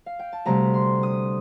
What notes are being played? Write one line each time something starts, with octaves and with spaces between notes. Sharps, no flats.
F5
G5
A5
D2 C3 G3 A#5
C6
D#6